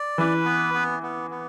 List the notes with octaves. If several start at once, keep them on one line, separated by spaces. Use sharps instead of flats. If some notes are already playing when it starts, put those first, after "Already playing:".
Already playing: D5
E3 B4
B3
B3
B3
B3